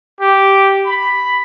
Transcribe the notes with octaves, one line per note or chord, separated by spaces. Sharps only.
G4
B5